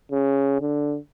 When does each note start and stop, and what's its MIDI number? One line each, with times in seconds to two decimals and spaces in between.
0.12 0.57 49
0.61 0.97 50